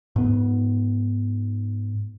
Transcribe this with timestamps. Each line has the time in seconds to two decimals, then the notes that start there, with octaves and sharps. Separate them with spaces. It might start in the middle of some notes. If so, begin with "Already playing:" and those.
0.16 G#2 B3